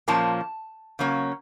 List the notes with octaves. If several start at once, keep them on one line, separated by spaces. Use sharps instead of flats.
A#2 F3 A#3 C#4 A5
C#3 F#3 A#3 C#4